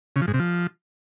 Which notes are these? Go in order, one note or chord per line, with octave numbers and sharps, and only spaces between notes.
C#3
F3
G#2
C3
F3